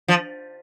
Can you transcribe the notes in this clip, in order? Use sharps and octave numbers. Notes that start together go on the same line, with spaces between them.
F3